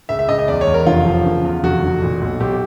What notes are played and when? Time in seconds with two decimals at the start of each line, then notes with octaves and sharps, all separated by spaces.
0.09 C#2 E5
0.19 E5
0.29 C#2 D#5
0.39 D#5
0.48 E2 D5
0.61 C#5
0.67 E2
0.74 A#4
0.87 F1 F4
1.06 F3
1.25 C#3
1.44 E2
1.63 F1 F#4
1.83 F1
2.02 A#2
2.21 B1
2.40 B1 G4